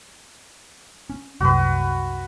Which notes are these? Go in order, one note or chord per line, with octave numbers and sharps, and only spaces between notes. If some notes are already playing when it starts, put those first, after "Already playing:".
C#4
C2 F#2 F#4 B4